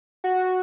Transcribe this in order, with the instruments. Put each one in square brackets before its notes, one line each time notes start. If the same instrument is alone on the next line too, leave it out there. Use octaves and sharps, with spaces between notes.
[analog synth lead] F#4